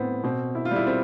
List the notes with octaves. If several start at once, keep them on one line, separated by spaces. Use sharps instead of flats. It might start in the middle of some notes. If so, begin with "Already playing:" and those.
Already playing: A2 B3 C4
B2 C4
E4
F4
G3 E4
C4